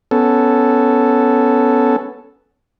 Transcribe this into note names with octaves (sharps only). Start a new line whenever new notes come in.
B3 C#4 A4